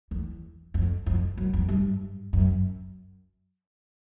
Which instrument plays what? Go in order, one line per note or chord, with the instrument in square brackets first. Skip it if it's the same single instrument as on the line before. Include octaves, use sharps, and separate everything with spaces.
[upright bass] E2
F2
F2
F#2
F2
G2
F#2